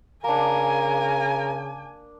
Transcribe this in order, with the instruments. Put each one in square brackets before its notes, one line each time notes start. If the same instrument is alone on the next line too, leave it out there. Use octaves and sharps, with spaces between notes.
[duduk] C#3 [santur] A#3 D4 [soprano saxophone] A#4 [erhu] G#5